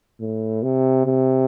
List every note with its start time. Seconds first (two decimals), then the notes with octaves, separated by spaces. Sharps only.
0.20 A2
0.63 C3
1.06 C3